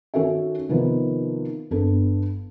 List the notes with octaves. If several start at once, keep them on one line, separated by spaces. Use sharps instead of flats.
D#3 C#4 F#4 A4 E5
C3 D#3 F3 B3
G1 B3 D4 A4